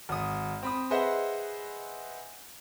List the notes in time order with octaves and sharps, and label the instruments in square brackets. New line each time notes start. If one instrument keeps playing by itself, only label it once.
[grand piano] G#1 D#6
C4 B5 D#6
G#4 B4 C5 D#5 E5 F#5